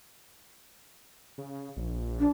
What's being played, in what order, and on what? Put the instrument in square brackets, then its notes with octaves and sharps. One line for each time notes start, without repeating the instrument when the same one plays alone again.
[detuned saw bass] C#3
A#1
[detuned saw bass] A#1 [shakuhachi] D4